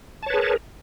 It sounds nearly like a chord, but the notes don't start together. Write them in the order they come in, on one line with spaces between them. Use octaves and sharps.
A5 C#5 B4 G#4 A#4